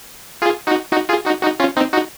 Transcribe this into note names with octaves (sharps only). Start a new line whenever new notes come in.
F4 G#4
D#4 F#4
D#4 F#4
F4 G#4
D#4 F#4
D#4 F#4
C#4 F4
C4 D#4
D#4 F#4